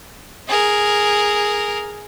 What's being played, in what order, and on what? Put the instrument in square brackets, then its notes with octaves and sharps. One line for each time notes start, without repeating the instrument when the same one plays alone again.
[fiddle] G#4 A#4